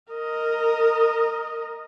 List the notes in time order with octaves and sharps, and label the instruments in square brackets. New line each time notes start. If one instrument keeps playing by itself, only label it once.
[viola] A#4 D#5